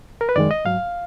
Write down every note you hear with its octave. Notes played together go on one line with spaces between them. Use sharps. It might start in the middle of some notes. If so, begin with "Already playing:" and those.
A#4
B4
F#2 D#3 G#3 D5
D#5
G#2 F#3 F5